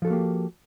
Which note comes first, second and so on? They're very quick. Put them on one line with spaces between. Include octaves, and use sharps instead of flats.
F3 A4 F#4 A#3 G4